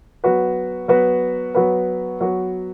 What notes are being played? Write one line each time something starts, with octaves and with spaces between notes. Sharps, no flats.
F#3 B3 F#4 B4
F#3 B3 F#4 B4
F#3 B3 F#4 B4
F#3 B3 F#4 B4